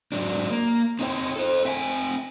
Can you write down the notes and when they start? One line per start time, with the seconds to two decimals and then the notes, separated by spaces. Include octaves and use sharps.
0.12 G#2 F#3 D4
0.51 A#3
0.99 C4 D#4 F4 B4 C#5 G5
1.36 A4 C5
1.65 C4 E5 G5 G#5